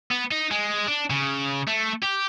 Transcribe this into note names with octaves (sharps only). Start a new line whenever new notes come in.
B3
D#4
G#3
D4
C#3
A3
G4